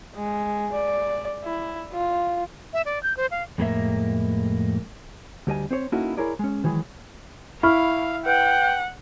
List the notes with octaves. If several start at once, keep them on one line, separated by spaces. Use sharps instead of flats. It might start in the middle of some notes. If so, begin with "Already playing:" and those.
G#3
D5
E4
F4
E5
D5
G6
C5
F5
F2 A2 G#3 A#3 A#4 E5
D2 G3 D#5 G#5
C4 C5 C#5
A#3 C#4 D#4 E4 F#4 A4
E4 G#4 A#4 C#5 D5
G#3 C#4
D#3 E3 F#3 G#3
E4 F5 B5 C#6 F6
B4 F#5 G5